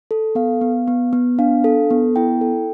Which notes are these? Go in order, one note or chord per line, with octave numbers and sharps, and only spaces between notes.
A4
B3 F5
B3
B3
B3
D4 F5
A4
B3
E4 G5
A4